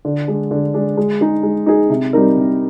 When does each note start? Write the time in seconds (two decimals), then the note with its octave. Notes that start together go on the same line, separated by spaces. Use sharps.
0.05 D3
0.28 G#3 D4
0.51 D3
0.74 G#3 D4
0.97 G#3
1.21 D#4 G#4
1.43 G#3
1.66 D#4 G#4
1.90 C3
2.13 G3 C4 D#4 A#4
2.36 C3